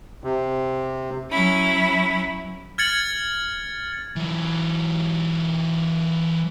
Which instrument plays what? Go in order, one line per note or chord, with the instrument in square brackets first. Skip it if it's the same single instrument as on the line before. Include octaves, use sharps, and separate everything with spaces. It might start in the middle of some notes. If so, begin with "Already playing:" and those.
[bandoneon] C3
[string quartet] F#3 C#4 E4
[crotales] F6 G#6 A6 C#7 F#7
[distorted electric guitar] E3 F#3